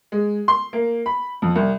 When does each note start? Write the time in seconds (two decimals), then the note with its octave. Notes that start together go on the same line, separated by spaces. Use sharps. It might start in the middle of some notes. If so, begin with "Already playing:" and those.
0.12 G#3
0.48 C6
0.73 A#3
1.06 B5
1.42 F2
1.56 C2